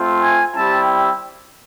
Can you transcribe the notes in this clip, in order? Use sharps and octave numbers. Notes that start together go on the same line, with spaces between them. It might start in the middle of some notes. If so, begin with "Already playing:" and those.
Already playing: A3 C4 F4
G#5
G3 C4 E4 G4 A5